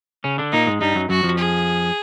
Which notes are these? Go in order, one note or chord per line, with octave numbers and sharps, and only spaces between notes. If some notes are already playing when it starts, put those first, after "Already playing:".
C#3 C#4
D3 D4
A#2 A#3 D#4
G#2 G#3
G2 G3 D#4
F#2 F#3
F#2 F#3 F#4
F2 F3
G#4